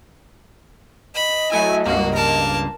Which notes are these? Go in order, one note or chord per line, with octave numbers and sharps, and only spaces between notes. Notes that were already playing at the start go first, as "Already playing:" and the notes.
D#5 B5
F#3 A3 E4 G#5
C#2 G2 A#3 F#4
A#4 A5